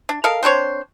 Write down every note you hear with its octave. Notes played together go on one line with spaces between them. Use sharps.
D4
A4 A#4 D#5 F5
C4 D4 C5 C#5